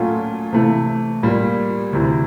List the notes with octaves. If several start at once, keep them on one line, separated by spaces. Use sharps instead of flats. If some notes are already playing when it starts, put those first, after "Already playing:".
Already playing: A#2 F#3 A3 C#4 F4
C3 E3 A3
A#2 G3 A#3
D2 C3 E3